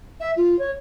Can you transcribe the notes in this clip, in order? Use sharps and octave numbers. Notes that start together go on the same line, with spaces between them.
E5
F4
C#5